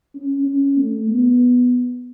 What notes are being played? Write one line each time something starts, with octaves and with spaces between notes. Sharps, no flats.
C#4
C#4
A3
B3